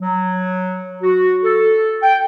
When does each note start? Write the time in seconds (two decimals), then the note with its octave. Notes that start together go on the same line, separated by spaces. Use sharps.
0.01 F#3
1.03 F#4
1.43 A4
2.03 G5